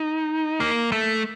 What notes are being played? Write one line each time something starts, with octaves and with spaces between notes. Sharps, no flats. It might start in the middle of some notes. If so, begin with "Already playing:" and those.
Already playing: D#4
A#3
A3